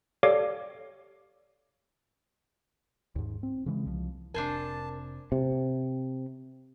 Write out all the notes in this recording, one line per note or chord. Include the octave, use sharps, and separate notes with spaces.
G4 A4 C#5 D5 F5 D6
D#2 G#2
C4
C#3 E3 G#3
C2 F3
F1 C3 D4 A#4 C5 G#5 A5
C3